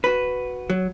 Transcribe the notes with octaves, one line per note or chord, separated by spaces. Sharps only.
F#4 B4
F#3